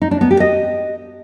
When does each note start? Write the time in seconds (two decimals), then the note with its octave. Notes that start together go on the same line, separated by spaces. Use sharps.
0.02 D#4
0.11 D4
0.21 B3
0.31 G4
0.40 D#5